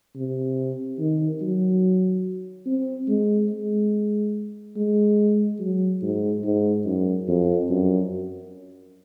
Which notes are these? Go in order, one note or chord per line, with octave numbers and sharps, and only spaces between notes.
C3
D#3
F#3
C4
G#3
G#3
G#3
F#3
G#2
G#2
F#2
F2
F#2